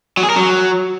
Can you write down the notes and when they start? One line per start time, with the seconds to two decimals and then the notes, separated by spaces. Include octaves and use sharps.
0.17 F#3
0.23 G#4
0.30 A#4
0.36 F#3